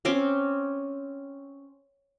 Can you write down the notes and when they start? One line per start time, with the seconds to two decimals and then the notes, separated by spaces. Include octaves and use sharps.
0.05 C4 C#4 C6 D6